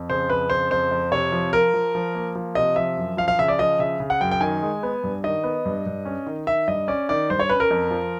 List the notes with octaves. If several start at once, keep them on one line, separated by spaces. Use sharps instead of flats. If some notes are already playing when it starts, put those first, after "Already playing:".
Already playing: F2
C#3 C5
F2 B4
C#3 C5
F2 C5
F2
C3 C#5
F3
F3 A#4
F3
F3
A#3
F3
C3 D#5
F3 E5
F#2
F3 F5
F5
C#3 E5
D5
F3 D#5
C#3 E5
C#3
F#5
F#2 G5
G5
D#3 G#5
G#3
B3
G2
D#3 D#5
B3
G2
G2
C#4
D#3
D#3 E5
G2 D#5
C#4 D5
D#3 D5
G2 C5
C#5
C#4 B4
A#4
F2
F3